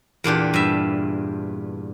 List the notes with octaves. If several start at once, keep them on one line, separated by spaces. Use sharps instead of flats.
E2 A#2 D4 G4
G2 E5